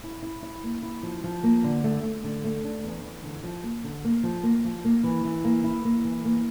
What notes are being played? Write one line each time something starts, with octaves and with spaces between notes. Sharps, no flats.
E4
E4
E4
A#3
E4
F3
F3
A#3
D3
A3
A3
D3
A3
D4
E2
E2
D3
F3
A#3
D3
A#3
F3
A#3
F3
A#3
E3
E3
A#3
E4
A#3
E3
A#3